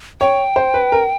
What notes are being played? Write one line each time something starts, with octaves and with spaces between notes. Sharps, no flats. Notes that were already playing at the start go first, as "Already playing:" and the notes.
C#5 G5
C5
B4
A#4